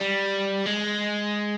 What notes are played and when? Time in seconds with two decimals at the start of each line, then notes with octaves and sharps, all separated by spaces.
0.01 G3
0.66 G#3